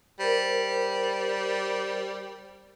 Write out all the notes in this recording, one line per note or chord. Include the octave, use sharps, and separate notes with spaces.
G3 A#4 C5